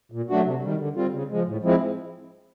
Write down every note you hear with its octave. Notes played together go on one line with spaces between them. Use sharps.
A#2
F#3 A3 D4 F#4
C3
D#3 G3
D3
G3 C4 F4
C#3
F3 G#3
A2
F3 G#3 C4 E4